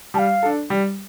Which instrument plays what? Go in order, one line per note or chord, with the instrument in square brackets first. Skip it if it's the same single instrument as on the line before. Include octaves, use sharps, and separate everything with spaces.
[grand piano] G3 [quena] A5
[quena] F5
[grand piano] D4 A4
G3